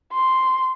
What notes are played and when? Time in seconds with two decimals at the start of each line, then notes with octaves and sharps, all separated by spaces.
0.13 C6